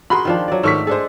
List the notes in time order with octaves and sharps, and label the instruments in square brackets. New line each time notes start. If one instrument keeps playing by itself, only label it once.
[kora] F#4 G#4 A#4 [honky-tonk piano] B5 C6
[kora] D#3 F3 D4
F#3 D5
[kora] G#2 A3 [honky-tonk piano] D#3 C#6 B6
[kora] G#3 D4 A4 [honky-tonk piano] G#4 C5